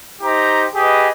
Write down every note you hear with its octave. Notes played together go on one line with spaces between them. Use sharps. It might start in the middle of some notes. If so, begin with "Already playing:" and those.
D#4 G4 C5 A#5
G4 G#4 B4 D#5